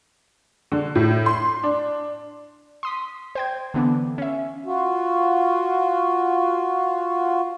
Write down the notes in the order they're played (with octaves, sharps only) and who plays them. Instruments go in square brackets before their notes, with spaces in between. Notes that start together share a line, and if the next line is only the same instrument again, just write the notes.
[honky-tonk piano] D3
A2
C6
D4
[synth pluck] C6 D#6 B6
C5 G5 G#6
D3 E3 B3 D4
C#4 E5
[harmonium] F4 F#4